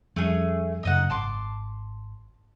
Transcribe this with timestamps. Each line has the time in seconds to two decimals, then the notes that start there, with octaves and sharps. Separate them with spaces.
0.16 F2 F3 G3 A3 C#4 G#4
0.83 F#1 F#2 C#3 D#4 D#5 F#5
1.10 G#1 A5 C6 D6